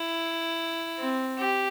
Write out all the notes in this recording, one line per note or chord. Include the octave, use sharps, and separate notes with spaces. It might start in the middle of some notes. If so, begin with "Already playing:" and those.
Already playing: E4
C4
G4